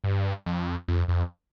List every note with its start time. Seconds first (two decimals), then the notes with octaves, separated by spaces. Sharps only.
0.04 G2
0.46 F2
0.88 F2
1.08 F2